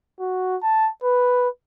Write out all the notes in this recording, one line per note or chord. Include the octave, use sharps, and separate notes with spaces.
F#4
A5
B4